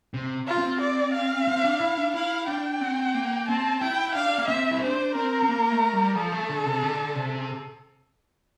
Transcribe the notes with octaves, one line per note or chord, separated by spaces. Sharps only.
C3
F4
C4
D5
F5
C4
D4
E4
D4
E4 F5
D4 G5
C4
A#3
C4 A5
E4 G5
D4 F5
A#3
C4 E5
E4
D4 C5
C4 A#4
C4
A#3
A3
G3
F3 A4
A3
D3
C3
D3
C3